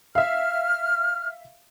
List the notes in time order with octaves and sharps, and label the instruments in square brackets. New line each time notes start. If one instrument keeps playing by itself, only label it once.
[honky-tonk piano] E5 F5 [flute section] F6